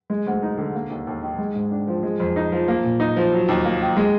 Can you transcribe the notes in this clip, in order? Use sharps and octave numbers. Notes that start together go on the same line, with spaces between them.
G#3
D2
D#4
D3
A#3
D#2
D#2
D#3
G#3
G#2
D4
F3
G#3
F2
D#4
F3
A#3
A#2
D#4
F3
F#3
D#2
A#3
D#3
G#3